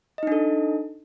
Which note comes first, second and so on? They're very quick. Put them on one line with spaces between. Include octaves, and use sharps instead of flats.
D#5 D#4 D4 A4